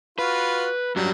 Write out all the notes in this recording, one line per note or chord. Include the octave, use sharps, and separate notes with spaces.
F4 F#4 B4
F#2 F#3 G3